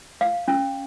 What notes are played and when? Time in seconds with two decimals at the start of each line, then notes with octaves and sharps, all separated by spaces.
0.21 F5
0.48 C#4